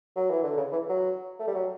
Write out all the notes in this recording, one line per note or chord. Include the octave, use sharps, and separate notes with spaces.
F#3
E3
D3
C#3
E3
F#3
A3
G3
F#3